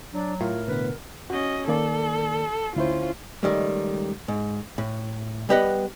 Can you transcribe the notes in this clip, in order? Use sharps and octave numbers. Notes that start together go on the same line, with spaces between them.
F#3 D4
A2 F4 A#4
B2 D3 B3 B4
C#4 F#4 D#5
D#3 A#3 A4 D5
D2 C#4 E4 F4 C5
C#2 D#3 G3 A3
G#2
A2
G3 B3 G4 B4 D#5 F#5